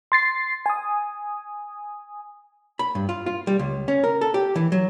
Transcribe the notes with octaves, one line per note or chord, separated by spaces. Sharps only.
C6 A6 C7
G#5 D#6
B5
G2
F4
F4
G3
C#2
C#4
A#4
A4
G4
E3
F#3